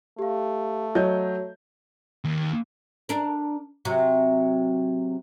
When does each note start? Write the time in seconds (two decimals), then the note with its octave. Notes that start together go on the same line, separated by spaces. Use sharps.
0.19 A3 G4 F5
0.95 F#3 C#5 D#5 G6
2.24 D#2
3.09 D4 A#4
3.85 C3 F#3